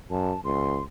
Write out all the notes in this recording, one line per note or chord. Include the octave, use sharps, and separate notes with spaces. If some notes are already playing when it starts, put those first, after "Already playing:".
F#2 A5
C#2 C6